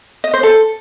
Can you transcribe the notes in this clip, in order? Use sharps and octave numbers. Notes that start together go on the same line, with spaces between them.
D#5
C5
A4